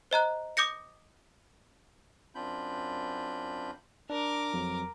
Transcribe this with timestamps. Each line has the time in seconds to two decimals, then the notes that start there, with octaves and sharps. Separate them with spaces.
0.11 C5 D#5 A#5 F#6
0.57 D6 D#6 G6 A#6 C#7
2.35 F#2 C4 D4 F4 B5 G6
4.10 D4 A#4 D6
4.53 F2 F#3